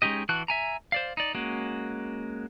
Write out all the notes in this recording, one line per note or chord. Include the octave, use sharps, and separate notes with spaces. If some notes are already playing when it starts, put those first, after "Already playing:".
G#3 C#4 D#4 G4 D#5
E3 F#4 A5 F#6
E5 G#5 A#5
C5 D5 F5
D#4 D5
G#3 A#3 C#4 F#4